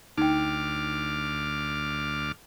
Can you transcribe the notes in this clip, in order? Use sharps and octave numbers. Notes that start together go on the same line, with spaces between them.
D2 D#4 G5 D6 F6